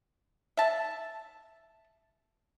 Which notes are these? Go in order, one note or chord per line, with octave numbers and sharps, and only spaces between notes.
E5 A5